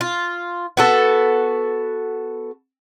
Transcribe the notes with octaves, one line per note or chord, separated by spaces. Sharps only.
F4
B3 F#4 A4